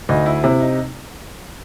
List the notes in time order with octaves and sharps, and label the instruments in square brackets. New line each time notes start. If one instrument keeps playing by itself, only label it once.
[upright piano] D2 [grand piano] D#4
[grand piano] E4
[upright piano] C3 [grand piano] E4
[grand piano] D#4